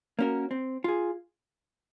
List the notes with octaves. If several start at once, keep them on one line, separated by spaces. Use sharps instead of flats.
A#3 C#4 F#4 A#4
C4
F4 G#4